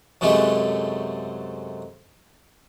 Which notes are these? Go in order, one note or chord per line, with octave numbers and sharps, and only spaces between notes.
F#2 C3 F#3 G#3 A3